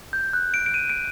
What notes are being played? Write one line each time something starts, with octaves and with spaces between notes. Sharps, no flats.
G6
F#6
D7
D7
D#7
D7